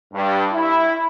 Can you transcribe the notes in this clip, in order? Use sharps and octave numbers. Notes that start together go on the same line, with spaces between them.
G2
E4